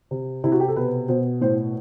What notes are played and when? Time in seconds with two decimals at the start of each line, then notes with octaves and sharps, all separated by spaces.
0.11 C3
0.44 C3 E4
0.52 F#4
0.60 G4
0.68 A4
0.76 B2 B4
1.08 B2 C5
1.41 A2 C5